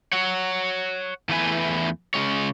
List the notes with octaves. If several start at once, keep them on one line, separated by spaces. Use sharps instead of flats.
C#5 F#5
E2 E3 A3 E4 B4 G#5
C#3 G#3 C#5